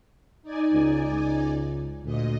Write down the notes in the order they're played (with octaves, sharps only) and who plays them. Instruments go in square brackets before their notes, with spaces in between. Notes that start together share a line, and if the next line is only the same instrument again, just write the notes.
[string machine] D#4 D5 G#5
[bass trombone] C#2
C#2
[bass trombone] D2 [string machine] A#2 D#5